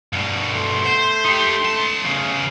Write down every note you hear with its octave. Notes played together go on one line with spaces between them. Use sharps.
G2 B2
A3 C6
C5
D#4 G4
C#2 A5
E2 C#3